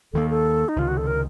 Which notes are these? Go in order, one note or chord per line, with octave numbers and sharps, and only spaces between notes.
D#2 D#3 A#3 A4
A4
D#4
C#2 C3 D#3 F4
F#4
A4
A#4